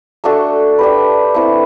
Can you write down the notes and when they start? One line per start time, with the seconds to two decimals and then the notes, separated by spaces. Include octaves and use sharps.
0.24 A3 D4 F#4 A4
0.79 D4 G4 B4
1.34 A3 C4 E4 B4